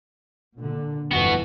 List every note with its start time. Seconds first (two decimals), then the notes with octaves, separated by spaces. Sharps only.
0.56 A#2 D3
1.11 G1 F2 E3 B3 F#4